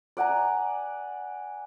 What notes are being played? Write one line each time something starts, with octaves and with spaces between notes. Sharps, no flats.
D5 F#5 G#5 A#5